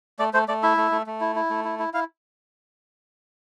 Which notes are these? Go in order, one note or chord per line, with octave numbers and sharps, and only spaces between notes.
A3 D5
A3 C5
A3 D5
E4 E5
A3
A3
A3
E4
E4
A3
E4
E4
E4 F5